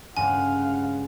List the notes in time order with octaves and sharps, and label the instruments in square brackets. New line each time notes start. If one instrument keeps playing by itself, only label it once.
[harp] C#2 G2 A#3 [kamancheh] F5 F#5 [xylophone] G#5